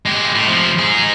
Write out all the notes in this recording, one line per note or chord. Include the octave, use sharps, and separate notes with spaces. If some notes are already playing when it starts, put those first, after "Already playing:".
G#3 G4
A2
C3 F3
D#4 G#4